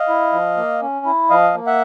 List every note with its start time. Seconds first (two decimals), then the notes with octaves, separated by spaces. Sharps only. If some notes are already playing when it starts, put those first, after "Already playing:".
Already playing: D#5 F5
0.09 E4
0.33 F3
0.57 A#3
0.82 C#4
1.06 E4
1.30 F3 D#5 F5
1.54 A#3
1.67 E5 F#5